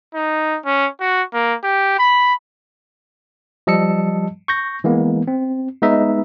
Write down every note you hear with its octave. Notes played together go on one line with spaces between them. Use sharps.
D#4
C#4
F#4
A#3
G4
B5
F3 G3 D#5 A5 E6 C#7
C#6 G6 A#6
E3 G#3 A#3 B3
C4
G#3 B3 D#4 B4 D#5 E5